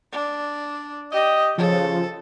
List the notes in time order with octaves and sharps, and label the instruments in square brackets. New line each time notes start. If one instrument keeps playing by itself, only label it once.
[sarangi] D4
[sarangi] G4 [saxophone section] D#5
[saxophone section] C#3 [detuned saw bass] F3 [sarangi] A4